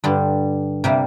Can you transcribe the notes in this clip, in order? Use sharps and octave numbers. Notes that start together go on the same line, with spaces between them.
G2 D3 G3
C3 G3 A#3